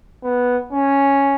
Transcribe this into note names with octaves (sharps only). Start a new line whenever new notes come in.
B3
C#4